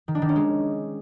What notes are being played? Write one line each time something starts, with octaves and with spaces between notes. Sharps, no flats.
D#3
D4
D#3
C#4
G#3